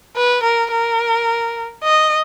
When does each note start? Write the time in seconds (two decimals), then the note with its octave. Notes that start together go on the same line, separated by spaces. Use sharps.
0.16 B4
0.43 A#4
0.71 A#4
1.84 D#5